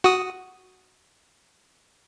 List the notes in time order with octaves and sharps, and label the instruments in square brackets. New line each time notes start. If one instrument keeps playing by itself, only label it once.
[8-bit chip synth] F#4 D#6